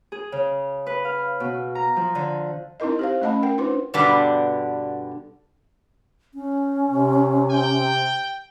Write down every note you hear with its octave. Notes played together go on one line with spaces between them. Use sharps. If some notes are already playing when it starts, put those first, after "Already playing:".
G#4
C#3
B4
F5
B2
A#5
F3
D3
C4 D#4 E4 A#4 D#5
G4 C5 F5
A3 C#4 D#5 F#5 A5 B5
A#4 F#5 G5
D4 D#4 F4 B4 C5
G2 B2 D3 G3 B3 D4
C#4
C3
G5